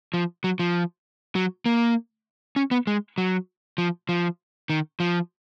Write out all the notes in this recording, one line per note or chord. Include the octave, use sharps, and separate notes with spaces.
F3
F#3
F3
F#3
A#3
C#4
B3
G#3
F#3
F3
F3
D#3
F3